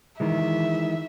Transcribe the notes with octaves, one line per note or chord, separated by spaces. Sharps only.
D#3 E3 G#3 E5